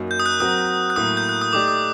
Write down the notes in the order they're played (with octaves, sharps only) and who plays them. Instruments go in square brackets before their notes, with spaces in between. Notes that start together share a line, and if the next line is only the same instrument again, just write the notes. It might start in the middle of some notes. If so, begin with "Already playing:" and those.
Already playing: [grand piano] F#2 F#3 A#3 D#4
[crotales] G6
D#6
F#6
[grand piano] F#3 C4 F#4 A#4 [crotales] D#6
[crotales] F#6
[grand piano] A2 F#3 A#3 [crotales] D#6
[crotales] G6
F#6
D#6
[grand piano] A3 D#4 G4 D5 [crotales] D6
[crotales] D#6